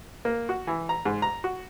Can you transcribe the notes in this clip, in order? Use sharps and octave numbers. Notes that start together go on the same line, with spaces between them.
A#3
F#4
E3
A#5
G#2
A#5
F#4